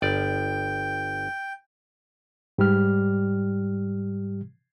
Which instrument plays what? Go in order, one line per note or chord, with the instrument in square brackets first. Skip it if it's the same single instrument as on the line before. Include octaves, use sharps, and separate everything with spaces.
[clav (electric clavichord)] G1 D5 [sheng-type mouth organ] G5
[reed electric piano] G#2 G3 G4 F6